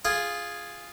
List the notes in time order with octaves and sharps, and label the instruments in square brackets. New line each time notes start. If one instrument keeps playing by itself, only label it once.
[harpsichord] F4 G#4